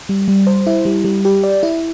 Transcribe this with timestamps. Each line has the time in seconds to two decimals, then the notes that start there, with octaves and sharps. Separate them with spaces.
0.09 G3
0.28 G3
0.47 C5
0.66 E4
0.85 G3
1.04 G3
1.25 G4
1.43 D5
1.63 E4